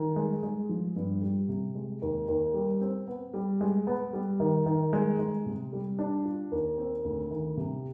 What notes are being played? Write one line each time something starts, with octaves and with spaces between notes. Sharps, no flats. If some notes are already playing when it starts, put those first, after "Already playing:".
Already playing: D#3
G#3
G#3
F3
G2
G3
C3
G#3
D#2
D#2
G3
C4
B3
G3
G#3
B3
G3
D#3
D#3
G#3
G#3
C3
G3
D4
F4
D#2
C4
D2
D#3
C3